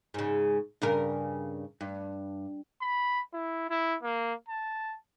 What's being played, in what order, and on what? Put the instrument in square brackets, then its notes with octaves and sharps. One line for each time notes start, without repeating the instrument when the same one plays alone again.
[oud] G#2 C#3
G2 C#3 A#4
G2
[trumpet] B5
E4
E4
A#3
A5